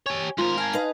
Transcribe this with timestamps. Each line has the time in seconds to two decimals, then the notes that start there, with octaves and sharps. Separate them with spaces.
0.06 G4 C#5 G#5
0.38 G#2 F4 A#4 C5 C6
0.58 F5 G#5 A5 G#6
0.73 D#4 B4 D#5